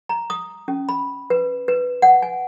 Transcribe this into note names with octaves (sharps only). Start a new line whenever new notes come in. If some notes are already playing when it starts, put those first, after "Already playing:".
A#5
D#6
C#4
B5
B4
B4
F#5
G#5